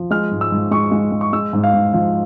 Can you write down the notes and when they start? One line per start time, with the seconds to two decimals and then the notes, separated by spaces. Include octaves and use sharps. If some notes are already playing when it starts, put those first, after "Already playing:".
Already playing: F3
0.11 G#3 F6
0.31 G#2
0.41 E6
0.52 G#2
0.71 G#3 C#6
0.92 G#3
1.12 G#3
1.21 C#6
1.33 G#3 E6
1.53 G#2
1.64 F5
1.74 G#2
1.93 F3 F5